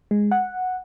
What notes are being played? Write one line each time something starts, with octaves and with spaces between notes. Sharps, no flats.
G#3
F#5